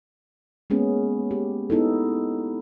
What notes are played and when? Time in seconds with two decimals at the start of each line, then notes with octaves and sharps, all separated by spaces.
0.70 G#3 A#3 B3 C#4 G#4
1.31 G4
1.70 B3 D#4 E4 A4